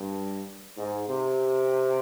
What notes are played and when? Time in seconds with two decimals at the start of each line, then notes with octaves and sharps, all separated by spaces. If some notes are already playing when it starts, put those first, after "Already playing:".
Already playing: G2
0.77 G#2
1.07 C3